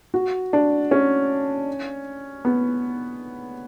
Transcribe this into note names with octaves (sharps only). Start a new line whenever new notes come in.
F#4
D4
C#4
B3